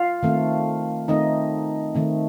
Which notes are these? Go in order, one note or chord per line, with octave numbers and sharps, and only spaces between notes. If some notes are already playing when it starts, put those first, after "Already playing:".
Already playing: F4 F5
D#3 A3 C4
D#3 A3 C4 D#4 D#5
D#3 A3 C4